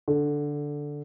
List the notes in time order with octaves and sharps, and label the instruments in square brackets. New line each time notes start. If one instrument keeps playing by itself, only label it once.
[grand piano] D3